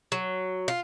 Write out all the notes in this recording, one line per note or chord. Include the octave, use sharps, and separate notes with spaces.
F#3
F4